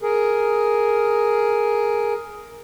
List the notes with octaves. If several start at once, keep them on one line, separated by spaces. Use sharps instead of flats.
G#4 A#4